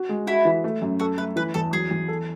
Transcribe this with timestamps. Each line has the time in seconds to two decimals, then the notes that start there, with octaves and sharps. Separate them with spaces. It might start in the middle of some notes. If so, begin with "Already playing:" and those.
Already playing: F#4
0.09 G#3
0.27 E4 F#4
0.45 E3
0.64 A3
0.82 F#2
1.00 F#4 A4
1.18 A3 B4
1.36 E3 B4
1.54 E2 A4
1.73 F#3 G#4
1.91 E2
2.08 A4